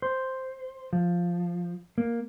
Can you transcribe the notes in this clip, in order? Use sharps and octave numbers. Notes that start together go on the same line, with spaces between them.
C5
F3
A#3